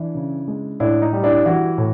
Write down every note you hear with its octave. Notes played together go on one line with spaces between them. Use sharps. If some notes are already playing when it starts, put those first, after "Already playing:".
Already playing: E3 D4 E4
C#3
G#3
A2 D4 E4
D#4
G3
D4 E4
E3 E4 F#4
A2